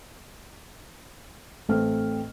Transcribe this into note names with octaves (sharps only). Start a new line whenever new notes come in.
A1 A3 C4 F6